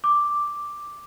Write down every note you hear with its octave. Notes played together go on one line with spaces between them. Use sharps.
D6